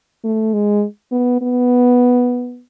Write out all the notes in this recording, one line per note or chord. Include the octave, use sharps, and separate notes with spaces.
A3
G#3
B3
B3